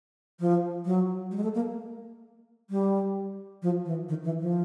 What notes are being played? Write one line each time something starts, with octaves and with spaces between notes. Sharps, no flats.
F3
F#3
G3
G#3
A3
A#3
G3
F3
E3
D#3
E3
F3